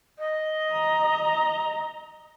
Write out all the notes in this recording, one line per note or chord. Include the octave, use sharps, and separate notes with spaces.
D#5
A#5